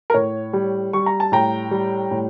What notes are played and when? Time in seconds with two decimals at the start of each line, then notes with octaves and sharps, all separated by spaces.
0.10 A#4
0.14 A2 C#5
0.53 G3
0.93 G3 C#6
1.06 A#5
1.20 A5
1.32 A2 G5 A#5
1.71 G3
2.11 A2